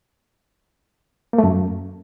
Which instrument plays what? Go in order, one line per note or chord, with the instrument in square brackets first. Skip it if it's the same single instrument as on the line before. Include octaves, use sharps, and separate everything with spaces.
[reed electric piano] A#3
A3
F#2